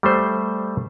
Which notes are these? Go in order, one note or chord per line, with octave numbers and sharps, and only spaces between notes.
G3 A3 C5